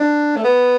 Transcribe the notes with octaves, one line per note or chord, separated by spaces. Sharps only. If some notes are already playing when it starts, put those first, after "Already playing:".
Already playing: D4
A3
B3